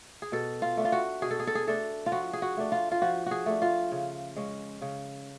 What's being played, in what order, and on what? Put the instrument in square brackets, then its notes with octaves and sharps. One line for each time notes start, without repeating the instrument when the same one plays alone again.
[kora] G#4
B2 A4
F4
A3 D4
F4
F#4
B2 G#4
A4
G#4
A4
G#4
A3 D4 A4
F4
F3 F#4
G#4
F#4
A3 D4
F4
F4
F3 F#4
F#4 G#4
A3 D4
F4
C#3
G#3 C#4
C#3